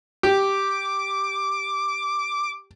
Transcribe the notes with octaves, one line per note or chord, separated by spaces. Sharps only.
G4 D6